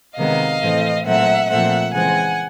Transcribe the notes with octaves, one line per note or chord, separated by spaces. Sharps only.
C3 D#3 G#3 B3 D#5 F5
A2 E3 A3 C4
A#2 F#3 A3 C4 E5 F#5
A#2 F3 A3 C4 E5 F#5
C#3 E3 G#3 C4 F#5 G#5